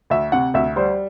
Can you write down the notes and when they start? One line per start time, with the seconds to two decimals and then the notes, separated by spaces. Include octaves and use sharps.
0.10 D2 E5
0.32 C3 F#5
0.54 D2 E5
0.76 G3 C5